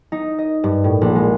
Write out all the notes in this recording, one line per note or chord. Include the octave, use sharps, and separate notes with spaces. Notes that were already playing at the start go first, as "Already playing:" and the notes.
D#4
D#5
G2
A2
A#1
G#3